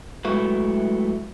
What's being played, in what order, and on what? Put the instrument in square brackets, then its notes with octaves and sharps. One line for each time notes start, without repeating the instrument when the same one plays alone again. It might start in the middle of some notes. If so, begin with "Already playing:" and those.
[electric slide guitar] F#3 G#3 A3 E4 F#4 B4